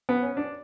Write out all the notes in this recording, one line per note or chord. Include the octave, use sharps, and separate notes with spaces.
B3
C#4
D4